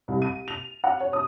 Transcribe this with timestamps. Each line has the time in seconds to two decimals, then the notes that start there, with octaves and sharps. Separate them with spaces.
0.08 C2
0.22 D#7
0.48 F7
0.84 F#5
1.00 C#5
1.13 D#6